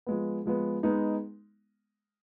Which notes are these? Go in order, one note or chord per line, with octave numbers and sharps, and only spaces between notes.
F3 G#3 B3
F3 G#3 B3
G#3 B3 D#4